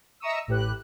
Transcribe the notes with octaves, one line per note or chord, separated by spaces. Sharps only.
D#5 E5 A#5 C#6 D#6 E6
A1 A2 G4 B4 F#6